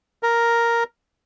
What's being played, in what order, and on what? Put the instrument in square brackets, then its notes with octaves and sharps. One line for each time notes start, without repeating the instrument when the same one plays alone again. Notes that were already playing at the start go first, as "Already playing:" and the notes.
[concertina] A#4